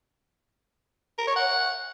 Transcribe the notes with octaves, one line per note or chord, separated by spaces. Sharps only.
A#4
C#5
F#5